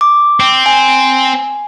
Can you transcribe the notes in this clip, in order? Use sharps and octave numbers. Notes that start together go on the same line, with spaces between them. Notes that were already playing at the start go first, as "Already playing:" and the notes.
D6
C4
G#5